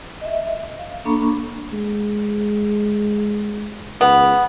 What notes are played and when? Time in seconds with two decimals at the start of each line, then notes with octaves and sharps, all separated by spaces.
0.21 D#5 E5
0.79 F5
1.05 A#3 D4 A4 A#5 B5 C#6
1.73 G#3
4.01 C#2 B3